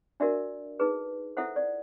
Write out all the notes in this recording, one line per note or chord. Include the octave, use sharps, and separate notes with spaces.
D4 F#4 A#4 D5 E5
D#4 G#4 B4
E4 A4 C5 E5 F#5
D5